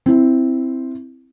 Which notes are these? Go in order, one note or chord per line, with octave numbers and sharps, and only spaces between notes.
C4 E4